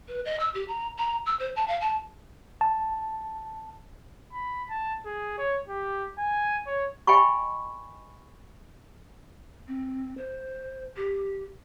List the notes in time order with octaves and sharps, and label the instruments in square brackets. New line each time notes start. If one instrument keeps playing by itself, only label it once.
[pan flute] B4
D#5
E6
G4
A#5
A#5
E6
C5
A5
F5
A5
[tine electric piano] A5
[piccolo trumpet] B5
A5
G#4
C#5
G4
G#5
C#5
[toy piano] D#5 G5 G#5 B5 C#6
[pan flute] C4
C5
G4